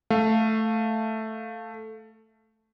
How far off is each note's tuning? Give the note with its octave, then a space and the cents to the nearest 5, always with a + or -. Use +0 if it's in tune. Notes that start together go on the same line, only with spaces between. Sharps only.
A3 +0 F5 +0